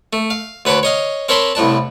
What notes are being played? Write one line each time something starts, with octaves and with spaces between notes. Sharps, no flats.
A3
F5
D2 B4 C#5 A5 D6
C#5 D#5 F5
C4 A#4 C#5 A5 B5 C6
C2 A2 D4 A5